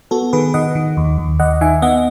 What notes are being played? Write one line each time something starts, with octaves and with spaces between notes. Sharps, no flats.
B3 F#4 A4
D#3 G#4 B4
D#3 D#5 F#5
D#3
D#2
D#2
D#2 D#5 F#5
D#3 E5 G#5
B3 D#5 F#5